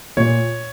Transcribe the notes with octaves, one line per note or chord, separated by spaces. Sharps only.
A#2 C#5